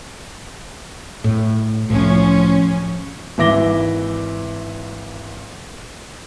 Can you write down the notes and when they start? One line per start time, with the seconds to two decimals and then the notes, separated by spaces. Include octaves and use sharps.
1.24 A2
1.89 C2 A2 F3 C#4
3.38 G#1 E3 E5 D6 A#6 G7